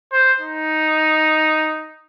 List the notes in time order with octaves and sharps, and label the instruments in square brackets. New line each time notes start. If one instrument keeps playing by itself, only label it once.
[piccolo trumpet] C5
D#4